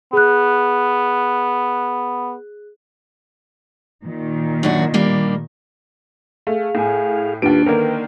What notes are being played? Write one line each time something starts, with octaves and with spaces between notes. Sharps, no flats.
B3 G#4 F#6
A#2 D#3
F#2 D4 F#4
G3 A#3 D4
A3 G#4 F5
A2 E4 G#5
D#2 A#3 D4 F4 G4 B4 D7
D3 D#3 A#3 A#4 B4